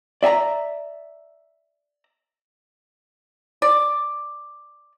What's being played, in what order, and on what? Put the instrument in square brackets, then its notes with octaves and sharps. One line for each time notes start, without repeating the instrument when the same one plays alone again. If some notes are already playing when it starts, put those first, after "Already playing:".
[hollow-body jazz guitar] D5 E5 G#5 A#5
[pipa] D5